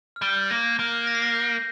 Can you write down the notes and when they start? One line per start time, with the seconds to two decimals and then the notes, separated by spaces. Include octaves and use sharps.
0.16 F6
0.21 G3 G6
0.50 A#3 A#6
0.79 A#3
1.07 A#6
1.15 C7
1.22 A#6
1.35 G6